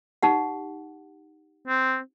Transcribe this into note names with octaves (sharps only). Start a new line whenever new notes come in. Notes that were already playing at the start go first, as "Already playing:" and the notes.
D#4 G4 F#5
C4